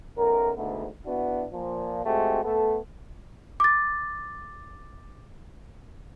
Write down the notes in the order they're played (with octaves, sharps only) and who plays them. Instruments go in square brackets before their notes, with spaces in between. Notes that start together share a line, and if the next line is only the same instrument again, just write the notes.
[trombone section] B1 F#2 A#4
D2 G#2 D3 A3 B3
B3 D4 E4 F#4
A#2 F3
G#3 A3 C4 F#4 G4
A3 B3 A4
[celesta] D6 A6